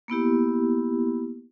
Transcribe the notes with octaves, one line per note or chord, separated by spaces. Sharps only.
A#3 B3 E4 G4